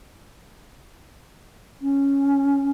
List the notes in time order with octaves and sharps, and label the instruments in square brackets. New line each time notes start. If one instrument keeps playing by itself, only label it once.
[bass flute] C#4